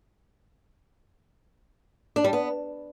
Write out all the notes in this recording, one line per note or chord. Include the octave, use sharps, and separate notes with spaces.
D4
G3
B3